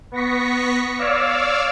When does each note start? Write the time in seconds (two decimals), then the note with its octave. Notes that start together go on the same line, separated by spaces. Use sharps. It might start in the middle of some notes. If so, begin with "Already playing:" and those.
0.12 B3 C#6 A#6 B6 C#7
0.98 C#5 D5 F5 D6 E6 F6